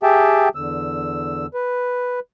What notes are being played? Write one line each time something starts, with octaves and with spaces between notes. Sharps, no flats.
G4 G#4 E5 G5 A5
E2 D3 E6
B4